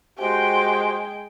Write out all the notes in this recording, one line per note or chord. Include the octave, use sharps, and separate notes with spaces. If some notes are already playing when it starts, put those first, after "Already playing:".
G#3 F#4 G4 C5 G5